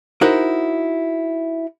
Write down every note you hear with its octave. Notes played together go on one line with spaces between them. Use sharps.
D#4 E4 F#4 A#4 C5